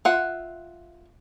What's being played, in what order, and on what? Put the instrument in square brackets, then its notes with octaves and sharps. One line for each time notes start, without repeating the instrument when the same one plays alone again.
[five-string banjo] F4 E5 F#5